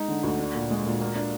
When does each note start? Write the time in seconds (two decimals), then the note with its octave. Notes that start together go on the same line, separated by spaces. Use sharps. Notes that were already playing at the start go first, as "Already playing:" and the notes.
Already playing: G#3 D#4
0.08 D3
0.23 D2
0.39 D4
0.54 A#2
0.70 G#3
0.86 A#2
1.01 A#3
1.15 D4